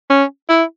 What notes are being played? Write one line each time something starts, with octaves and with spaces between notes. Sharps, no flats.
C#4
E4